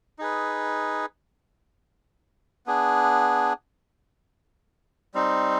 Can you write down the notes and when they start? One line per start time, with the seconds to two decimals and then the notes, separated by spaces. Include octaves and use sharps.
0.19 D#4 G#4 B4
2.66 B3 D4 G#4
5.14 G3 C4 D#4